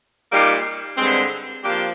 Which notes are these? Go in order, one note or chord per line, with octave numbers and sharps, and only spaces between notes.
A#2 G3 A#3 D#4 G4
G2 D3 G#3 C4
F3 A#3 D4 G4